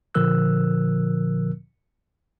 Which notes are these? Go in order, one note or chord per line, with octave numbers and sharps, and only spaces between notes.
A#2 D3 F3 A#4 E6 F#6